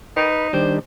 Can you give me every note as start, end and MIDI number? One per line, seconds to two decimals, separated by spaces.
0.16 0.50 63
0.16 0.48 71
0.53 0.79 51
0.53 0.79 55
0.53 0.79 62
0.53 0.75 72